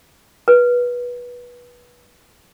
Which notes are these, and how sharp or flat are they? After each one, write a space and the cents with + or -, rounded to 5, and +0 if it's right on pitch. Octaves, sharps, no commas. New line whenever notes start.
B4 -20